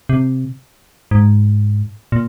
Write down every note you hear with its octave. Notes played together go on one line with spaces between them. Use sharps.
C3
G#2
A#2